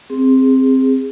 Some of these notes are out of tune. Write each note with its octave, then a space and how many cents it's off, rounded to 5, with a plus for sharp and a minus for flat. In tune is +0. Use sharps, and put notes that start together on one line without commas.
C4 +0 G#4 -20